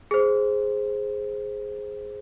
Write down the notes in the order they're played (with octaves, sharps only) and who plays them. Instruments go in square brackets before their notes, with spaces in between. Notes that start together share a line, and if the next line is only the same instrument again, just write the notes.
[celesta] G#4 C5